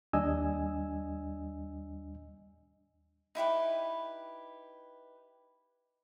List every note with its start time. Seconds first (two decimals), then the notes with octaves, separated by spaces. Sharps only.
0.13 D#2 G3 D4 D#5 G#5 E6
3.35 D#4 E4 G4 B4